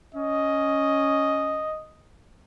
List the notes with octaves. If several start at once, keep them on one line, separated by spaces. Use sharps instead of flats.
C#4 D#5